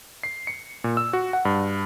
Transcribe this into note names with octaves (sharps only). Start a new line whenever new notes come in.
C7
C#7
A#2
E6
F#4
F#5
G2